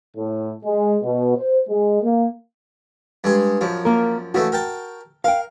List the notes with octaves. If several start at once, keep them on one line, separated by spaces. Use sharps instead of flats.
A2
G#3
B2
C5
G#3
A#3
G2 G#3 G#4
F#2 F3
A#3 A#4
C#3 E3 A3 F#4
A#4 G5 A5
A#4 F5 G5